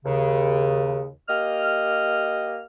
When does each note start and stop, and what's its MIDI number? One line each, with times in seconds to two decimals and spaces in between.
0.05 1.10 39
0.05 1.10 49
1.29 2.62 58
1.29 2.62 67
1.29 2.62 75
1.29 2.62 89